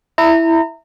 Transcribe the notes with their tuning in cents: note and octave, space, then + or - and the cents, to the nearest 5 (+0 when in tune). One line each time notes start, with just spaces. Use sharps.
E4 +0 A#5 -30